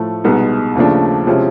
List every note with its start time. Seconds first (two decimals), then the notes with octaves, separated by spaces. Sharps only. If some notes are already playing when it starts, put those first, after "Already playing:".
Already playing: A2 F3 A3
0.24 C2 B2 G#3 B3 D#4
0.75 D#2 C#3 F3 A3 D4
1.27 C3 F3 G#3 C#4 E4